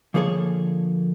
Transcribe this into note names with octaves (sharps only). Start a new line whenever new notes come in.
D3 F3 A#3 G#4 A4 C#5